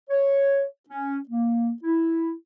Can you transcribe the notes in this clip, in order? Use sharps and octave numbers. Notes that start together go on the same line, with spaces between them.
C#5
C#4
A#3
E4